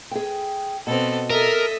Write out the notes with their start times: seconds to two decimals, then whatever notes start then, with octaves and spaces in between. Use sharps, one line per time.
0.11 G#4 G5
0.87 B2 B3 C4 A4
1.30 A4 A#4 D#5 E5